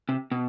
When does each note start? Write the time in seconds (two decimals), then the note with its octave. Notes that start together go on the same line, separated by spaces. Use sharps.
0.09 C3
0.32 B2